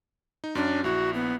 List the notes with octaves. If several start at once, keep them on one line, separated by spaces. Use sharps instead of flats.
D#4
F#2 F#3 C#4 D4
A#1 E4 F#4
B3